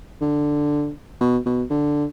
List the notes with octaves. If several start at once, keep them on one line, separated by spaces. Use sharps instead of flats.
D3
B2
B2
D3